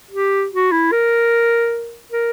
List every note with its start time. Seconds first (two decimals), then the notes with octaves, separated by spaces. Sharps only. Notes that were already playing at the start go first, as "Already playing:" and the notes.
0.11 G4
0.52 F#4
0.72 E4
0.92 A#4
2.12 A#4